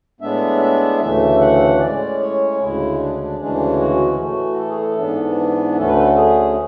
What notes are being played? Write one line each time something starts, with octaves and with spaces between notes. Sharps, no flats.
A2 G#3 B3 D4 E5
E5
D2 C#3 E3 A3 E5
F#5
A2 G#3 C#4 D5
C#5
D2 C#3 G#3 E4
D4
D4
D2 C#3 E3 G#3 C#4 D4
F#4
A2 E3 A3 F#4
A4
G#4
A4
G#2 E3 B3 D4
D2 D3 A3 C#4 A4
B4
A4
G#4